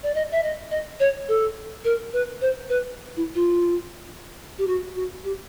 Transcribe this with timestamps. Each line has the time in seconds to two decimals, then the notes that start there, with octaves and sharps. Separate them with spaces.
0.03 D5
0.15 D#5
0.32 E5
0.43 D#5
0.71 D#5
1.00 C#5
1.28 A4
1.84 A#4
2.13 B4
2.41 C5
2.69 B4
3.17 E4
3.35 F4
4.58 G4
4.67 F#4
4.95 F#4
5.24 G4